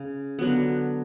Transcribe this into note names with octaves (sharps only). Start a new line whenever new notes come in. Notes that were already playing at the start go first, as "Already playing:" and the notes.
Already playing: C#3
D3 F#3 B3